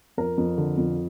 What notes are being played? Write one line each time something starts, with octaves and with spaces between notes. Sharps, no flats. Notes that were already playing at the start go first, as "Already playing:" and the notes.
F2 A#4
F2
D3
F2